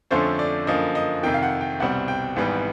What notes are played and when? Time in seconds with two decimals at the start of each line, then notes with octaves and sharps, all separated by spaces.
0.11 F2 D3 F3 A3 C#4 C5
0.39 D5
0.67 F#2 D3 F3 A#3 D#5
0.95 D#5
1.23 F2 C3 D#3 G5
1.34 F5
1.43 F#5
1.61 G5
1.80 C2 B2 G3 C4 F#5
2.08 G5
2.36 G#1 G#2 E3 G3 B3